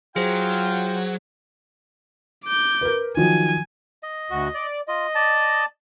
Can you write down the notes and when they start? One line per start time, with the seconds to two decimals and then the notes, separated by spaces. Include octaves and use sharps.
0.16 F#3 F4 G#4 C5 G5
2.45 D6 G6
2.81 A#4 B4
3.17 D#3 F3 F#3 G#5
4.03 D#5
4.30 D2 F#4
4.54 D5
4.88 F4 D#5
5.15 D5 A5